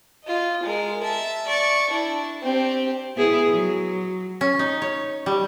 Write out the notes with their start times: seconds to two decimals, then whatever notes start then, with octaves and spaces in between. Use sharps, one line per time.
0.24 F4 D#5
0.63 G#3 A#4
1.03 E5 A5
1.47 D5 C#6
1.90 D4 E4
2.42 C4 G4
3.16 B3 E4 G#4
3.50 F#3
4.41 C#4
4.59 D#4
4.82 C#5
5.26 G3